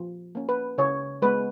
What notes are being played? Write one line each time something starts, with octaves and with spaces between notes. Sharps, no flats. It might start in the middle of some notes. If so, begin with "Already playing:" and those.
Already playing: F3
A#3 C#4
B4
C#3 C#5
G#3 B3 B4